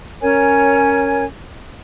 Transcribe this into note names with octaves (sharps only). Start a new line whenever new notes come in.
C#4 A#4 C#5 G#5